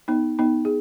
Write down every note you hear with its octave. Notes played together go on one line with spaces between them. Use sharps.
B3 D#4
B3 D#4
G#4